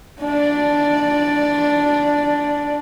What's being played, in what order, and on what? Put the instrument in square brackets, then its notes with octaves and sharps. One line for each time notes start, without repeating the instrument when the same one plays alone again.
[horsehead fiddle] D4 D5